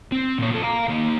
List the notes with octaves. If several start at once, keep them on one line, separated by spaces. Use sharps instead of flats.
C4
A#2 C#5
F3 A4
F5 A#5
D#3 A#3